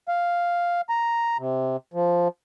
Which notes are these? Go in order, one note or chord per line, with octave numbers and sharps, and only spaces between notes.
F5
A#5
C3
F3